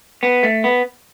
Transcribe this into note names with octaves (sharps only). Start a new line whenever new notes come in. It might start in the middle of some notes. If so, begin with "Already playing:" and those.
B3
A3
B3